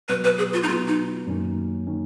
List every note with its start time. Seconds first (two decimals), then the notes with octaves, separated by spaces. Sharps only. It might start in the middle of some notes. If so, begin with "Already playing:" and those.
0.09 B2 F#3 B3 B4
0.24 B4
0.38 G#4
0.53 F4
0.63 D#4
0.68 B2 F#3 B3 F4
0.88 D#4
1.27 F#2 D#3 A#3 C#4
1.87 D#3 A#3 C#4